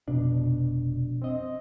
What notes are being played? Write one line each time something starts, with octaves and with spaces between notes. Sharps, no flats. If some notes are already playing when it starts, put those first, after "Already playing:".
F1 B2 D4
C4 D#5